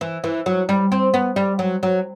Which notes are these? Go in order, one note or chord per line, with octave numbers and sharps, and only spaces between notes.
E3
E3
F#3
G3
C4
B3
G3
F#3
F#3